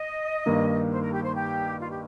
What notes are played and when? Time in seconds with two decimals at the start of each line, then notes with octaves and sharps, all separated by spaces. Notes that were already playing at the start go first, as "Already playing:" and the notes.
Already playing: D#5
0.46 G2 D#3 A#3 D#4
0.91 C5
1.02 A#4
1.12 G4
1.23 C5
1.35 G4
1.80 F4
1.89 G4